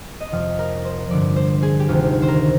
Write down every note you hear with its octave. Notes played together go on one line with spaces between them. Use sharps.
D#5
F2 C3 F3 F5
A#4
C5
G2 D3 F3 D5
C5
G#4
G4
D2 C3 D#3 F4
C5
A#4